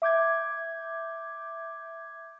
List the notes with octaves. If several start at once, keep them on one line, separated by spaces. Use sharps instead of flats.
E5 D6 G6 G#6